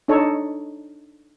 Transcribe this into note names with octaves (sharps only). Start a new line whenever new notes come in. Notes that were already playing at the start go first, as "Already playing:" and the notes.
D4 D#4 A4 C#5